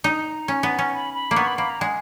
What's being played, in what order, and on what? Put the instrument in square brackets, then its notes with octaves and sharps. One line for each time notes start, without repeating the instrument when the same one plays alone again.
[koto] D#4 [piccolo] A#5
[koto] C#4
B3
C#4
[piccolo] B5
B5
[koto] A#3
[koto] B3 [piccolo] C#6
[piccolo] B5
[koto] A#3 [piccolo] B5
[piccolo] A#5
[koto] G#3 [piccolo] F#5